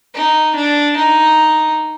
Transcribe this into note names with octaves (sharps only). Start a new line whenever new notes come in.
D#4
D4
D#4